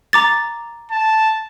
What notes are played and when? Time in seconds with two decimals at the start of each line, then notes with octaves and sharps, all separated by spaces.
0.13 A#5 D6 A6
0.91 A5